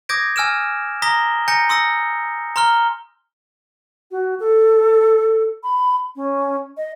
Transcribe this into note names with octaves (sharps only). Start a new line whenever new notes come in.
D6 D#6 G6 G#6 A#6 D7
G#5 E6 F6 D7 E7
A#5 D#6 A#6 B6 G7
G#5 A#5 G6 A#6 C#7
C6 D#6 E6 A#6 C#7
A#5 C6 F6 G7
F#4
A4
B5
C#4
D#5